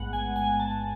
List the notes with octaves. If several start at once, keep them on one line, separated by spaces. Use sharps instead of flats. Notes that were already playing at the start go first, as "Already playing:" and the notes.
Already playing: A1 G#2 G#3 B3 F#5
G#5
G#5
A5